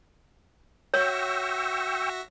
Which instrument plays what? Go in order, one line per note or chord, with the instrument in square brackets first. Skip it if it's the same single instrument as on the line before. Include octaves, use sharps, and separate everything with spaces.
[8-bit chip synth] F#4 E5 A#6 [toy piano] C#5 [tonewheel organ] G5 C#6 E6